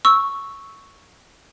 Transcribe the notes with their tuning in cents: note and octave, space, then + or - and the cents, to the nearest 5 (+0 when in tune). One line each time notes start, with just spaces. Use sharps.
C#6 +0 E6 -5